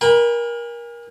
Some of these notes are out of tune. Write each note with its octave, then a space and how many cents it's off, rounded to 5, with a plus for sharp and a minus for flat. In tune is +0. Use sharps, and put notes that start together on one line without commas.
A#4 +25 G#5 -35 B5 +0